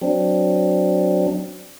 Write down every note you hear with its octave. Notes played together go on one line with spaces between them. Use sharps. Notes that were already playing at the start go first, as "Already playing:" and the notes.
F#3 C4 D4